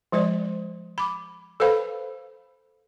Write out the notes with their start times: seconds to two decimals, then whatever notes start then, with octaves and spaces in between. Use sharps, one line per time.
0.12 F3 G#3 C5 D5
0.98 B5 D6
1.60 A4 B4 C5 F5 B5